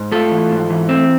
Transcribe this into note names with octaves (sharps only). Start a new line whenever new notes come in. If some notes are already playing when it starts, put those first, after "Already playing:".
Already playing: G#2
A3 F4 A4
E3
G#2
E3
A3 C4